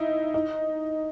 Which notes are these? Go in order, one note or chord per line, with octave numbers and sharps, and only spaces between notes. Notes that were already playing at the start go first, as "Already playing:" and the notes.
Already playing: D#4 E4
D#4